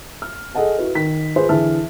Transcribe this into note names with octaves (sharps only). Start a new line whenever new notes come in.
F6
G#4 A4 D#5 F#5 A5
E4 F#4 B4
D#3 B6
F4 G#4 B4 C5
D3 E3 E4 G#4 A5 F6